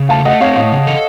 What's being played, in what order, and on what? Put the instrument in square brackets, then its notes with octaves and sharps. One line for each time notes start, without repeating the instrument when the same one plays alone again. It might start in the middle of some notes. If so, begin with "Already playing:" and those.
Already playing: [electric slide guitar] C#3
[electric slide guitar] A3 [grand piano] F5 A5
[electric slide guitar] A3 [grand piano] D#5 F#5
[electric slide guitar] C4 [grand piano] C#5 F5
[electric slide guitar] A2 [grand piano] C#5 F5
[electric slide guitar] C#3
A4